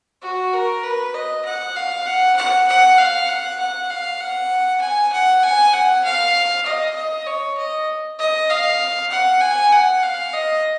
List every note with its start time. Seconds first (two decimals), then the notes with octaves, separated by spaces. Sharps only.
0.22 F#4
0.53 A#4
0.83 B4
1.14 D#5
1.45 F#5
1.76 F5
2.06 F#5
2.36 F#5
2.68 F#5
2.98 F5
3.28 F#5
3.59 F#5
3.90 F5
4.20 F#5
4.81 G#5
5.12 F#5
5.43 G#5
5.73 F#5
6.04 F5
6.66 D#5
6.96 D#5
7.27 C#5
7.58 D#5
8.19 D#5
8.49 F5
9.11 F#5
9.41 G#5
9.72 F#5
10.03 F5
10.34 D#5